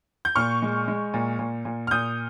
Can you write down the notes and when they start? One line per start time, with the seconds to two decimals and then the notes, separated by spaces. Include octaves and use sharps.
0.25 G6
0.35 A#2 C#6 F6
0.62 G#3
0.88 G#3
1.14 A#2
1.39 A#2
1.65 A#2
1.87 F6
1.91 A#2 D#6 G6